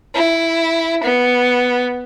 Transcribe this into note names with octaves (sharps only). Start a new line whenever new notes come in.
E4
B3